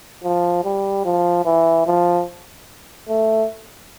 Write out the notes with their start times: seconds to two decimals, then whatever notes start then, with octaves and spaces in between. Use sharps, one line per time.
0.24 F3
0.64 G3
1.05 F3
1.45 E3
1.87 F3
3.09 A3